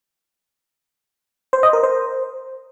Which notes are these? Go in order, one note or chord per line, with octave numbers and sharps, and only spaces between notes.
C5
D#5
A#4
C5